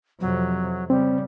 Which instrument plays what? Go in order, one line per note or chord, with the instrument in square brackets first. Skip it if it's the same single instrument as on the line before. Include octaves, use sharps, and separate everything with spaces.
[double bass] F2 C3 [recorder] F#3
[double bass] C#3 [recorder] G3 [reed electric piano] C4